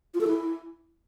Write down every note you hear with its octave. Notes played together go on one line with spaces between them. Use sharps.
F4
A4
E4